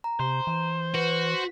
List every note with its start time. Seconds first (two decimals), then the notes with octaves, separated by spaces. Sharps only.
0.04 A#5
0.20 C3 C5
0.47 E3
0.94 F#4 B4
1.34 B6